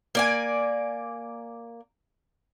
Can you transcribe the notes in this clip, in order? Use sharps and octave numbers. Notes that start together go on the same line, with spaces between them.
A#3 D5 G#5